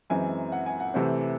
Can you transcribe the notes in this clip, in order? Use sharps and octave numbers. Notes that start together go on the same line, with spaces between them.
F#2 E3 G#3 C4 G#5
F#5
G#5
F#5
C3 E3 A3 C4